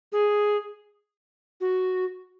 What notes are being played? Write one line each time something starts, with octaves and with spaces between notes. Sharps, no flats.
G#4
F#4